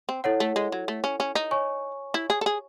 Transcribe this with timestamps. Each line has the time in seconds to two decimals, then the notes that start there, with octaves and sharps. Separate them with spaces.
0.09 C4
0.24 E4 A4 C#5 F#5
0.40 A3
0.56 G#3
0.72 F#3
0.88 A3
1.04 C#4
1.20 C#4
1.35 D#4
1.51 C#5 G#5 C#6
2.14 E4
2.30 G#4
2.41 A4
2.46 G#4